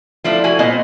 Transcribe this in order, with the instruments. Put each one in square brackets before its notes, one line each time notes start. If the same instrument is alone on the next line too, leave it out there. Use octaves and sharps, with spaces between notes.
[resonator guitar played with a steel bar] F3 A3 D4 E4
A3 E4 F#4 G#5
A#2 B3 C5 D#5 G#5